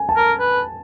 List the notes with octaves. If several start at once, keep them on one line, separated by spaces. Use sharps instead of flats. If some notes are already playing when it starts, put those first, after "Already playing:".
Already playing: G#5
A5
A#4
B4